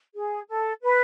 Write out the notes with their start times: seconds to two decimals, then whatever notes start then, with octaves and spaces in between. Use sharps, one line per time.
0.16 G#4
0.49 A4
0.83 B4